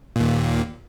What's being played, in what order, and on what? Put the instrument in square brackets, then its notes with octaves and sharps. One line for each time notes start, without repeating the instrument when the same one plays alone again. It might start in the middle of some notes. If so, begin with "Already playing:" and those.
[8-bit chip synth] D#2 A#2